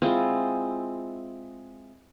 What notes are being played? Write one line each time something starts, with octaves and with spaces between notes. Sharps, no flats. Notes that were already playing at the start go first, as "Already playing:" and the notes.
G#3 C4 E4 F4